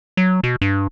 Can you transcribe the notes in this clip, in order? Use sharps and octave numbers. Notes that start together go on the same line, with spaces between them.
F#3
B2
G2